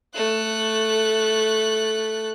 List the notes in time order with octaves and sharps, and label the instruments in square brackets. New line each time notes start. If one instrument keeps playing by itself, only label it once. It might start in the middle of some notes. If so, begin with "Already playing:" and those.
[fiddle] A3 F#6